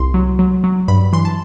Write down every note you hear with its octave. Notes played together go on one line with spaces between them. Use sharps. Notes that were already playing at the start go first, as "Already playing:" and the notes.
Already playing: C2 C6
F#3
F#3
F#3
G2 B5
E3 C6
A5